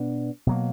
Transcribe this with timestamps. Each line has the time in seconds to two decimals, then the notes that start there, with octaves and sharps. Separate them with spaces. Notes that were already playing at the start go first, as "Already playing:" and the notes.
Already playing: B2 B3 D4
0.47 B2 F#3 A#3